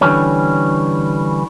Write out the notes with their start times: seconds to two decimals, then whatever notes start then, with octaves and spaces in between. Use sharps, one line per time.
0.01 D3 E3 G3 C#4